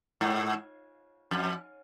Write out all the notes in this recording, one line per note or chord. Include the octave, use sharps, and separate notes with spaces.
G#2
F2